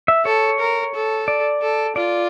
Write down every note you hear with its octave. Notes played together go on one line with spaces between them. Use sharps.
E5
A4 C#5
A#4
A4
D5
A4
F4 D5